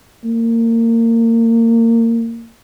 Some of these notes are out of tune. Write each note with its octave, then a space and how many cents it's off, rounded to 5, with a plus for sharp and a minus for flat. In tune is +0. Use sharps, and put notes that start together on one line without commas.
A#3 -25